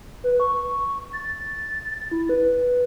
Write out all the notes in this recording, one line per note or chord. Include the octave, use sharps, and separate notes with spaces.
B4
C#6
A6
E4
B4